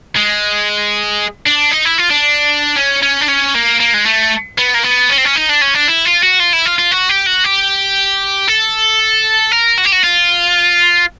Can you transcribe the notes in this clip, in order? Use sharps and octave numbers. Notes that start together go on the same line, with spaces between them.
G#3
D4
D#4
E4
F4
D4
C#4
C#4
D4
C#4
A#3
A#3
G#3
A3
B3
A#3
B3
C#4
C4
C#4
D#4
D4
C#4
D4
E4
F4
F#4
F4
E4
F4
F4
F#4
G4
F#4
G4
A4
A#4
F#4
G4
F#4
F4